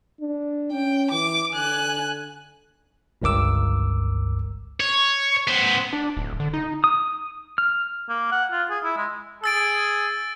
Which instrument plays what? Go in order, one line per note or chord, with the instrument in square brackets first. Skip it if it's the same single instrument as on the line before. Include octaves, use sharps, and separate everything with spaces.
[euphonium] D4
[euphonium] C#4 [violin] G5
[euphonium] E3 [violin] D6
[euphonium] D3 [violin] G#5 F#6
[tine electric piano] G1 C#2 G2 A#4 D6 E6
[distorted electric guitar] C#5
B3 C5
[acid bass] D4
D1
D3
D#4
[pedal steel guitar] D#6
F6
[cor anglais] A#3
F#5
F4
G#4
E4
G#3
[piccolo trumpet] G#4 [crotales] E6 A6 D7